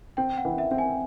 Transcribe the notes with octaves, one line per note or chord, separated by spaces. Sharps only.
C4 G5
F#5
E3
E5
C4
G#5